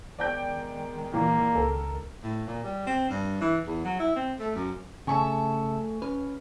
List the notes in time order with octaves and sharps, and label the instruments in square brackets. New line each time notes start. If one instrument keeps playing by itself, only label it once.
[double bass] D#3 G#3 [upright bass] B3 [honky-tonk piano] D5 G5 G6
[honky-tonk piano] A#2 E3 [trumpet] A#3
[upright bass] C#2 [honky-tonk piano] A4 A#4
[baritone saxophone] A2
A#2
G3
C4
G2
E3
E2
F#3
E4
C4
A3
F#2
[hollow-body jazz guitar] C#3 [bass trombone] A3 [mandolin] C#5 E5 A5 [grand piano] G#5 C#6
[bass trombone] C#4 [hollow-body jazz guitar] B4 [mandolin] F6